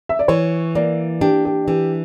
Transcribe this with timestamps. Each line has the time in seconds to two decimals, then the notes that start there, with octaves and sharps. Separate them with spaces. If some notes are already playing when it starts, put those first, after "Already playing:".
0.09 E5
0.19 D5
0.28 E3 C#5
0.75 A#3 D5
1.21 D4 G4
1.45 G4
1.68 E3 G4